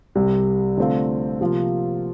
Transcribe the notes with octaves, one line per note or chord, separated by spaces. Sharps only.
C2 C3 G3
D3 A3 C4 F4 C5
C3 F3 A#3 F4